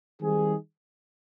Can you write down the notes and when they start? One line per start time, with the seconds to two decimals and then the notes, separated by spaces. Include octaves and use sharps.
0.21 D#3 G3 C4 D#4 G#4